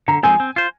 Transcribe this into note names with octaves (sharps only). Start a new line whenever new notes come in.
D3 A#5
F3 G#3 C4 G#5
C4
F4 C5